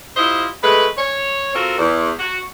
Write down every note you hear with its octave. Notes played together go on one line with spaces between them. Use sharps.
E4 F4 G4 C5 D#5
G#3 A3 B4
C#5
C4 F4 F#4 A4 A#4
E2
F#4